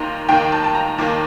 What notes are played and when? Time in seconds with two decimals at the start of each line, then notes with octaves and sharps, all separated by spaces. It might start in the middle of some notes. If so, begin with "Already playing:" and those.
Already playing: D#2 D#3 A#3 A#5 C6
0.29 D#2 D#3 A#3 G5
0.52 A5
0.64 A5
0.75 A#5
0.98 D#2 D#3 A#3 D6